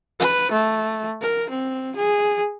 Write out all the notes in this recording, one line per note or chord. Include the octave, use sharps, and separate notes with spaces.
B4
A3
A#4
C4
G#4